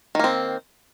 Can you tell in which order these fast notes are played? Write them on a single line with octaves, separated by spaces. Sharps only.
D#3 A#3 C4